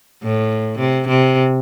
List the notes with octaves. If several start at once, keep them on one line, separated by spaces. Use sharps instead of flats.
A2
C3
C3